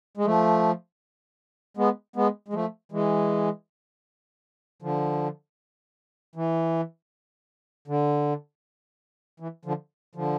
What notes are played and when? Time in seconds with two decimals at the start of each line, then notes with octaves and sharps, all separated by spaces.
0.17 G#3
0.25 F3 A3
1.77 G#3 B3
2.16 G#3 B3
2.48 G#3
2.53 F3 A3
2.92 E3 G#3
4.82 D3 F3
6.36 E3
7.88 D3
9.40 E3
9.65 D3 F3
10.15 D3 F3